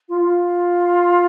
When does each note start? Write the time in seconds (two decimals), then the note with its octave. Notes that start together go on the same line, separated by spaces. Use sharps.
0.08 F4
0.21 F4